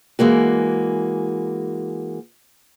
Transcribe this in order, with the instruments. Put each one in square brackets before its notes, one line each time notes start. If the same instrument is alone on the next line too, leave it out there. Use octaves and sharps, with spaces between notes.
[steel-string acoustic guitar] E3 G#3 A#3 F#4